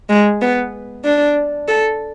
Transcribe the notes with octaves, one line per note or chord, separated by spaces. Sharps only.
G#3
B3
D4
A4